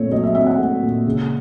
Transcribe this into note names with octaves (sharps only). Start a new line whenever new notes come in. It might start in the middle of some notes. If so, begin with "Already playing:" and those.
Already playing: A#2 A3 C4 C#5
F#3 D#5
E5
C4 E5
F#5
A3
A#2
C#3